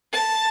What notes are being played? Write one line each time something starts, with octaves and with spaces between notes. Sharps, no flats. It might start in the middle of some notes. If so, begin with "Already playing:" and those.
A5